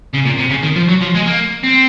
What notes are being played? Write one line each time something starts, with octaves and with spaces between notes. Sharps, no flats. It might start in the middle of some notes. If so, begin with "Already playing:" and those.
C#3
A#2
C3
C#3
D#3
F3
F#3
F3
G#3
A#3
C4